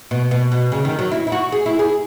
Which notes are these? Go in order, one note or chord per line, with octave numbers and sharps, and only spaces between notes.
B2
B2
B2
C#3
D#3
F#3
E4
E4
F#4
G#4
E4
G#4